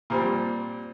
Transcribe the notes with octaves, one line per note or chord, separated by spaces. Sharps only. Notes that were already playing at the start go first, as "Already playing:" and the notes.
A#2 F3 G3 C4